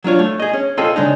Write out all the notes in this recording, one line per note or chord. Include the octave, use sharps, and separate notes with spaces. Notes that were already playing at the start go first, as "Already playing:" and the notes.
F#3 D4 F4 C#5
A3
G#4 D#5
C#4
C4 F4 G#4 A4 D#5 A5
C#3 G#3 D4 D#4